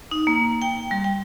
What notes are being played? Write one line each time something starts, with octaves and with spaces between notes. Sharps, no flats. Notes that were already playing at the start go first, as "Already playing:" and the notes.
D#4
A#3
G5
G3
G5